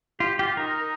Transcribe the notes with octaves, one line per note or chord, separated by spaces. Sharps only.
F4 G4
F4 G4
D#4 A#4